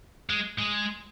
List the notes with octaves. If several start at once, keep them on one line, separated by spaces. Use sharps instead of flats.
G#3
G#3